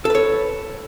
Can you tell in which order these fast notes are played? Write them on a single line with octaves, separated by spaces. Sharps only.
A4 B4 C#5